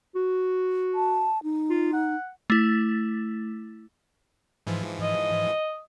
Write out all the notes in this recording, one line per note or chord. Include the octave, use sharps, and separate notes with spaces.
F#4
A5
D#4
F4
F#5
A3 E4
G#2 E3 F3
D#5